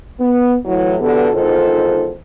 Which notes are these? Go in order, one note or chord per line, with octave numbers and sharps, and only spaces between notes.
B3
A2 E3 F#3
B2 D3 E3 B3 G4 A4
E2 G#2 D#3 F4 A4 C5